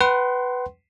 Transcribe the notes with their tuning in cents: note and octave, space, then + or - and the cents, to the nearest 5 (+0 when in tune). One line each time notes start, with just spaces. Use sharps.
B4 +5 F#5 +40 C6 +0